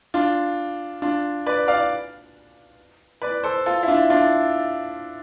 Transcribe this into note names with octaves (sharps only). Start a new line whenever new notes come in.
D4 F4
D4 F4
B4 D5
D5 F5
B4 D5
A4 C5
F4 A4
E4
D4 F4
D4 F4